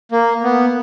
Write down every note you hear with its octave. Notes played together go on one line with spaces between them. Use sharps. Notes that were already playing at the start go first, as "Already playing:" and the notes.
A#3
B3